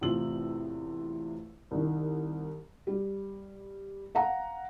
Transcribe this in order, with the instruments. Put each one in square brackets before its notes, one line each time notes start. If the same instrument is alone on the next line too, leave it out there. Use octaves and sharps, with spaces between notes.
[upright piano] E2 A2 C3 F4 E6 F#7
C2 D#3
[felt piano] G3
F5 F#5 A#5